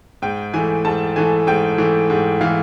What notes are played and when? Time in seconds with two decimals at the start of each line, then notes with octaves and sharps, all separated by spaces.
0.22 G#2 G5
0.54 E3 A3 G#5
0.85 G#2 A5
1.16 E3 A3 G#5
1.47 G#2 G5
1.78 E3 A3
2.10 G#2
2.41 E3 A3 F5